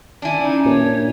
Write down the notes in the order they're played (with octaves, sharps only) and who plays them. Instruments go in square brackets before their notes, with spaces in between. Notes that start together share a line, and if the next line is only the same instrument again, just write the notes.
[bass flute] D#3 [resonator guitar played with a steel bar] D4 E4 [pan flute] G#5
[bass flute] C#4 [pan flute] D#4
[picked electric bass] A#2 [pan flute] C#5
[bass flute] D4